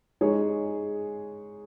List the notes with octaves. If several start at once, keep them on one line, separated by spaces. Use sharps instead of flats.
G#3 D#4 G#4 C#5